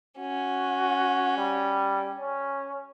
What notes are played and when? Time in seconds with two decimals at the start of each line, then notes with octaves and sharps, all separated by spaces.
0.19 C#4 F#4
1.38 G3
2.19 C#4